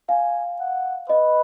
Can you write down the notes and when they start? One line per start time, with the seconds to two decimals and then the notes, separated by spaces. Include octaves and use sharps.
0.09 F5 G#5
0.60 F#5
1.10 B4 D#5